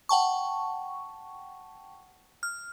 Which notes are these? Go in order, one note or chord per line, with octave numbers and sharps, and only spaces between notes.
F#5 G5 A5 C#6
F6